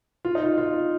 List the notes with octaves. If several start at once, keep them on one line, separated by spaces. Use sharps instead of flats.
F4
D#4
F4
F4